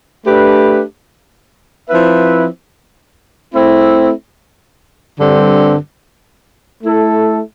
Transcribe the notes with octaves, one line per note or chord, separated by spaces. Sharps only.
A3 D4 G4 B4
F3 C4 E4 B4 E5
A3 C4 E4
G2 D3 G3 C4
A3 E4 A4